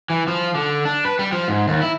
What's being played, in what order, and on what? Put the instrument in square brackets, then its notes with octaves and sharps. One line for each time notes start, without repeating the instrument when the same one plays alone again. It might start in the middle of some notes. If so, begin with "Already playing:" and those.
[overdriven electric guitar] E3
F3
D3
D4
B4
G3
F3
G#2
D#2
E4